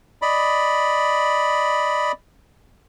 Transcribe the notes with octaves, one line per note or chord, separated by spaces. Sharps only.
D5 D#5 B5